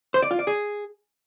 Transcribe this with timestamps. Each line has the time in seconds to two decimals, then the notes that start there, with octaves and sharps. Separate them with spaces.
0.14 C5
0.22 D5
0.31 F4
0.39 D5
0.47 G#4